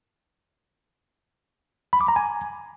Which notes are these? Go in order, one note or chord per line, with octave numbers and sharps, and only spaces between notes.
B5
D6
A#5
G#5